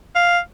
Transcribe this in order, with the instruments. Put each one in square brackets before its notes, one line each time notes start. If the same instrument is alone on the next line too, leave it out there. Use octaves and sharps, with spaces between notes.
[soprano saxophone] F5